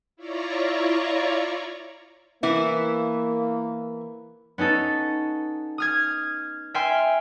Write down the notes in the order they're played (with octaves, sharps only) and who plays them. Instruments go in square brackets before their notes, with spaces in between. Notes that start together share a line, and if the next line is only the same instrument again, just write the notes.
[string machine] E4 F4 C#5 D5 A#5 C#6
[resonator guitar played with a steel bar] E3 B3 E4 [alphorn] A#3
[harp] B3 C#4 D#4 A4
D#6 F6 G#6
E5 G5 G#5 C6 F6